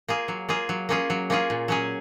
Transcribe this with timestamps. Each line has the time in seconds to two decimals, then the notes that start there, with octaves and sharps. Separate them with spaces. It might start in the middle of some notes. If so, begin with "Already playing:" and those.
0.08 A#3 F4 G#4
0.28 F#3
0.49 A#3 F4 G#4
0.69 F#3
0.89 A#3 C#4 F4 G#4
1.10 F#3
1.30 A#3 C#4 F4 G#4
1.50 A#2
1.68 F#3 C#4 G#4